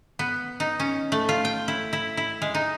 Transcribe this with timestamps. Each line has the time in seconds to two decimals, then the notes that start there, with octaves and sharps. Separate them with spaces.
0.19 B3
0.60 D#4
0.80 C#4
1.12 A3
1.29 F4
1.45 G5
1.68 E4
1.93 E4
2.17 E4
2.42 G#3
2.54 D#4